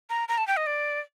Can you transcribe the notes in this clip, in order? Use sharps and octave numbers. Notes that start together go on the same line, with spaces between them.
A#5
A#5
A5
G5
D#5
D5